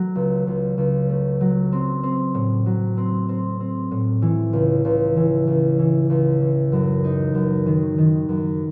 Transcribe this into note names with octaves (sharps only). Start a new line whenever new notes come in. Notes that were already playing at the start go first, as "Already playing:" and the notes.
Already playing: F#3 A3
C#2
C#2
C#2
A3
F#3
C4
C4
A2
F#3
C4
C4
C4
A2
E3
C#2
C#2
E3
C#2
E3
C#2
E3
F#2
D#4
F#2
D#3
D#3
F#2